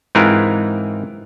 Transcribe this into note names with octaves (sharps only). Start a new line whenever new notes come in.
G#2 E3 G#3 C4 F4 A#4